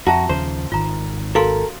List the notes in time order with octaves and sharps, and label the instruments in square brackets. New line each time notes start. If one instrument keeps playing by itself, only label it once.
[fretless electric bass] F2 [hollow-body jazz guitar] F#4 [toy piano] E5 A5 A#5
[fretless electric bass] D#2 C#3 F3 [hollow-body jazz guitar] C5
[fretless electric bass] G#1 D#3 [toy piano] F4 A#5
[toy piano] F#4 F5 C6 [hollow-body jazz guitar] A4 A#4